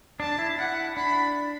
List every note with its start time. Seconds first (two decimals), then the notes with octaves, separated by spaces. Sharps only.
0.20 D4 A5
0.38 E4
0.58 E4 F#5
0.97 D4 B5